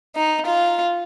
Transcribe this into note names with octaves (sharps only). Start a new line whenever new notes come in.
D#4
F4